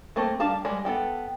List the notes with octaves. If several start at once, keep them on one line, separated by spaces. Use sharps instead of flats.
A3 A#3 C4
G3 D4 F5 A5 A#5
G3 G#3
B3 A4 G5